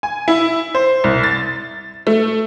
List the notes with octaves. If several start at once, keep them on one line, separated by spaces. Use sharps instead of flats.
G#5
E4
C5
C2
A6
A3